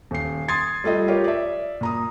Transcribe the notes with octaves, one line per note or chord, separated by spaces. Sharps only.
D#1 C7
C6 D#6 G#6 A6 C7
G3 A3 F4 D#5
F4 G4 A#4 C#5
D5 E5
A#2 A#5 D#6